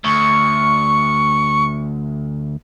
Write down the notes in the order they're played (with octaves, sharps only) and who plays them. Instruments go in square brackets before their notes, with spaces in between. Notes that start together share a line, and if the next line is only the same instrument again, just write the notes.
[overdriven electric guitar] D2 [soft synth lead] C#6